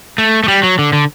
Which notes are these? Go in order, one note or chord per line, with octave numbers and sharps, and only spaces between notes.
A3
A3
G3
F#3
D3
D3